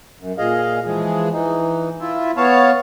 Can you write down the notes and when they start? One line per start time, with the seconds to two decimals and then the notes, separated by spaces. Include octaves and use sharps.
0.20 F#2
0.38 A#2 G#4 D#5 F5
0.86 E3 F3 G#3 G#4
1.33 E3 D#4
2.00 E4 F4 E5
2.37 B3 C#5 F5 A5